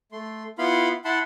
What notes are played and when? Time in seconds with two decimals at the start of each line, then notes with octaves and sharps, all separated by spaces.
0.12 A3 C6
0.58 B3 E4 F4 F5 B5 C6
1.05 E4 F#5 A5 B5 C6